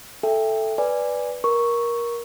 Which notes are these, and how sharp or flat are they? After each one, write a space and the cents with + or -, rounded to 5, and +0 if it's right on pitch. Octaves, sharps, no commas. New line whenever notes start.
A4 +0 E5 +0 G5 +20
B4 +0 D5 +0 G#5 -10
A#4 +20 C#6 +0